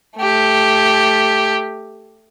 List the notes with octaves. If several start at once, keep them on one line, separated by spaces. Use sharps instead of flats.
A3 G4